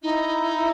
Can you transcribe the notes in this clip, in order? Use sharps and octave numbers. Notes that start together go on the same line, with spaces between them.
D#4 E4